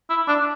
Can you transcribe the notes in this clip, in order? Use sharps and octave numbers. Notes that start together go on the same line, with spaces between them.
E4
D4